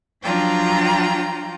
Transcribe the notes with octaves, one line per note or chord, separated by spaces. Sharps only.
F3 F#3 D4 F4 G5 A#5